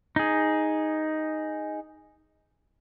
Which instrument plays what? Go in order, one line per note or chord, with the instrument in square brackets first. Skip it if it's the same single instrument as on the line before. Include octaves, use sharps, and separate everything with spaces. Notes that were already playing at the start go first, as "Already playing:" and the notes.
[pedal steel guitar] D#4 G#4